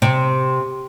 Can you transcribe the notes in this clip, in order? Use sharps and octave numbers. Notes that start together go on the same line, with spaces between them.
C3